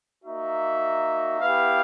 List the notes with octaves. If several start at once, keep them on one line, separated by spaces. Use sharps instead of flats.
A#3 D#4 F#4 E5
B3 E4 G4 F5